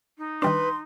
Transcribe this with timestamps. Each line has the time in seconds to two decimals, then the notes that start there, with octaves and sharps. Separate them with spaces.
0.18 D#4
0.42 D#3 G3 D4 B4 C6